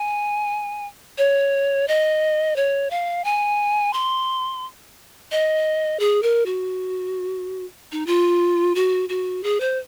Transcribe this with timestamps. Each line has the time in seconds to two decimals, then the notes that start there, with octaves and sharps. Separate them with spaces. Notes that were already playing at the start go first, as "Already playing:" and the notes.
Already playing: G#5
1.18 C#5
1.88 D#5
2.56 C#5
2.91 F5
3.24 G#5
3.93 C6
5.32 D#5
6.00 G#4
6.23 A#4
6.46 F#4
7.92 D#4
8.07 F4
8.75 F#4
9.09 F#4
9.43 G#4
9.60 C5